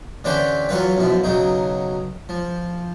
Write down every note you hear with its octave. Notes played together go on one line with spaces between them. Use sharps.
D3 E3 C#4 G4 B4 C5
E3 F#3 F4 B4 C#5
F#2 B2 F3 E4
B1 C#3 F#3 D#4
F3